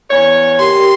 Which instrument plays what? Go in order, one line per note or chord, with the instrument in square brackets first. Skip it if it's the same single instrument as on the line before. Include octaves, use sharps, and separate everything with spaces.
[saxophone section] E2 C#5
[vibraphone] G4 A#4 G5 [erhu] C6